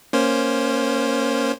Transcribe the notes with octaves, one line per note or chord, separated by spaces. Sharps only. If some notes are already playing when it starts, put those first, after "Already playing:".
A#3 C#4 C5